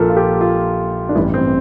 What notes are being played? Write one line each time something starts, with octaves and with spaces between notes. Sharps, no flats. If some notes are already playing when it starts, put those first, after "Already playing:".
Already playing: A#1 A#2 F3 A4 A#4
F4
G4
F4
D4
A1 G2 E3 G3 E4
C4